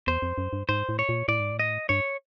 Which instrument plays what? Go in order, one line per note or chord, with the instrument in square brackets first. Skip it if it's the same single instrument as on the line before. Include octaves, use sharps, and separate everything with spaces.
[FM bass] E2 [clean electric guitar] C5
[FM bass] F2
F#2
G2
[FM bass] G#2 [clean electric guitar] C5
[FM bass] A2
[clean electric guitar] C#5
[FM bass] A#2
[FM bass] A2 [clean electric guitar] D5
[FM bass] G#2
A2
[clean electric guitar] D#5
[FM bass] G2 [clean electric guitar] C#5